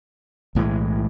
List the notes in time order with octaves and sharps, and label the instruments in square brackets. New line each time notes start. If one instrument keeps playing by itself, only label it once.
[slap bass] B1 A2 E3 G#3